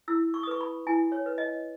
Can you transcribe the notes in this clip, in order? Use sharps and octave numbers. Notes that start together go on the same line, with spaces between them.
E4 E6
C#6
D#6
B4 C#6
B5
E4 G#5
C#5
B4
D#5